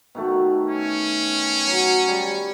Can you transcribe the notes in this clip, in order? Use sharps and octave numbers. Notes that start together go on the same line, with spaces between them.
B2 D#3 A3
C#4
F#3
G3